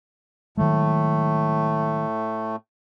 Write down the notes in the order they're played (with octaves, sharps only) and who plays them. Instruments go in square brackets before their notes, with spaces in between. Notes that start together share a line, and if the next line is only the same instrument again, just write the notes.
[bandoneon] A2 A3 [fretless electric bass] D#3 F#3 G#3